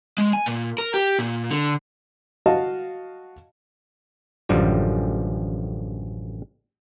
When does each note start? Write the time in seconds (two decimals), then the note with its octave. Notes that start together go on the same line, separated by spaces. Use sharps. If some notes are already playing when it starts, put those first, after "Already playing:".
0.18 G#3
0.33 G#5
0.46 A#2
0.78 A#4
0.94 G4
1.19 A#2
1.51 D3
2.46 F#4 D#5 F5 A5
4.49 A1 F#2 D3 F3 G3